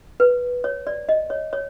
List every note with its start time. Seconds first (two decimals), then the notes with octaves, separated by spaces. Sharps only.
0.20 B4
0.64 C#5
0.87 D5
1.09 D#5
1.30 C#5
1.53 C#5